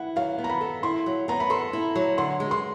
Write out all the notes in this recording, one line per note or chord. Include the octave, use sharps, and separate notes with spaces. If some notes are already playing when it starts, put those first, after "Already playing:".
Already playing: E4 F#5
F#3 F5
B3
A#5
B5
A4
E4 C6
F#3
B3 A#5
B5
A4 C6
E4
F#3
D3 C6
G#3
C6